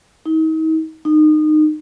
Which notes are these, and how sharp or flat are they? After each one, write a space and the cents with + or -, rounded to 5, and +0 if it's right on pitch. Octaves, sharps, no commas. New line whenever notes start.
D#4 +40
D#4 -25